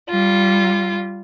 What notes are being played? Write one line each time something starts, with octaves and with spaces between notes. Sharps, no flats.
G3 F4